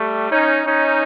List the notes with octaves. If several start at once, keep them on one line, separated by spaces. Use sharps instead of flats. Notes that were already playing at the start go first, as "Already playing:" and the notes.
Already playing: G3 A3
C#4 D#4
C#4 D#4